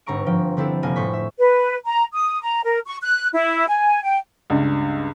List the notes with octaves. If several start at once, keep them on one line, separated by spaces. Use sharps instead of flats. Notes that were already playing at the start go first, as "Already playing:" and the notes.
G1 G#2 C4 A#5 C#6 D7
F3 G5
D3 C4 E4 G4 A4
F1 A#3 G#5
A2 C5 C#6 B6
E5
B4
A#5
D#6
A#5
A#4
C#6
F#6
E4
G#5
G5
C#2 G2 C#3